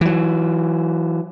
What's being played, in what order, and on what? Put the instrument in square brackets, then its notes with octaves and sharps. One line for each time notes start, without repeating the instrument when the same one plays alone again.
[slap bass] E3 F#3